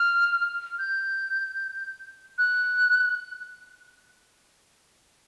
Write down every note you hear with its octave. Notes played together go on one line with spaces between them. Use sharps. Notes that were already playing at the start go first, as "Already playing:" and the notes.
Already playing: F6
G6
F#6